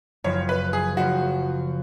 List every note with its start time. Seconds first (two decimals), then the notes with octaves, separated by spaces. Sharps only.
0.24 F#1 F#2 C#3 F3 C#5
0.49 B4
0.73 G#4
0.97 F#1 F#2 C#3 F3 F#4